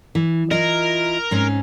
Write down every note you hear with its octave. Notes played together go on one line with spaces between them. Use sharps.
E3
E4 F4 A#4 D#5
G#2 C4 C#4